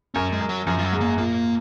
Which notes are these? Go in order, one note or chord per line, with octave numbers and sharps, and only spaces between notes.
F#2 C#4
G#3
F#2
F#3
F#2 F3
F3
F#3
G#2
A#3
A#2 A#3